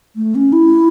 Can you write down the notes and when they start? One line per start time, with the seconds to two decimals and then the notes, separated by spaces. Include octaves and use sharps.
0.16 A3
0.35 C#4
0.53 E4